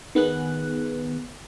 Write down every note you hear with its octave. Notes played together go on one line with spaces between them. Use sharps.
D#3 B3 G#4 F#6